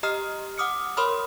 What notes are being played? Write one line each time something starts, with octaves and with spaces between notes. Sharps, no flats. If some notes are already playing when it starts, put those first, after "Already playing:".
G4 D#5 A#5 D#6 F6 C7
F#5 D6 D#6 F6 C#7
A#4 C#5 B5 C6 D#6 F6